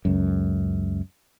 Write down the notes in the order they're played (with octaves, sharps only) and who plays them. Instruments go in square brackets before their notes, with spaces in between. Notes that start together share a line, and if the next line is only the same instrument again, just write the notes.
[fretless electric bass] C#2 F#2